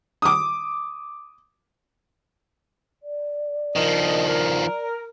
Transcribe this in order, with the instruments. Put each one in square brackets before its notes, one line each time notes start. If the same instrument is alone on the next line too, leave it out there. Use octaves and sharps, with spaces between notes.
[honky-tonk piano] D6 D#6
[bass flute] D5
[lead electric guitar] D#3 F3 [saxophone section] A#4 D#5
[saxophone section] A#4